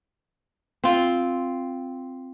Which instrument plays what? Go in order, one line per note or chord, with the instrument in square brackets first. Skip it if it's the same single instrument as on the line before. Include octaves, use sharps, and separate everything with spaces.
[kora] C4 F4